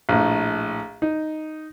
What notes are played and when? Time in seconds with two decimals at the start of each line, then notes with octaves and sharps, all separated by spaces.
0.09 A#1 A2
1.02 D#4